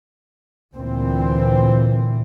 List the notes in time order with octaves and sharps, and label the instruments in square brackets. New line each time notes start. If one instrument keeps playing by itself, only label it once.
[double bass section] D2 A#2 E3 C4